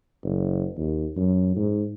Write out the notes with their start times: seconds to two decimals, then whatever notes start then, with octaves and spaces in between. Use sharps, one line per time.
0.24 F#1
0.77 D#2
1.17 F#2
1.56 G#2